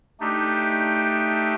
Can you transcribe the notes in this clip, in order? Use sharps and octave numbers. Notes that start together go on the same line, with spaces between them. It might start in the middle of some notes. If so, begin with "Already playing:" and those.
A3 D4 D#4 G4